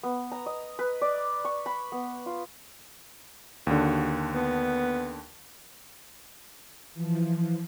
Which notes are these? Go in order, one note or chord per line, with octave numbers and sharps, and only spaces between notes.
B3
A#5
D#5
B4
D5
C#6
B5
B3
F4
D#2 D3 F#4
B3
E3 F3